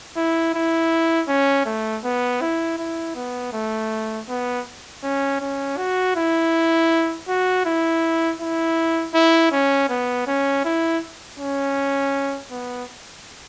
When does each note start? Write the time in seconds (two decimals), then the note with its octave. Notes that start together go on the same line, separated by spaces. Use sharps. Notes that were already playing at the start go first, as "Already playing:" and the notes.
0.17 E4
0.54 E4
1.28 C#4
1.66 A3
2.04 B3
2.41 E4
2.78 E4
3.15 B3
3.53 A3
4.29 B3
5.03 C#4
5.41 C#4
5.77 F#4
6.16 E4
7.28 F#4
7.65 E4
8.40 E4
9.14 E4
9.52 C#4
9.89 B3
10.27 C#4
10.64 E4
11.39 C#4
12.51 B3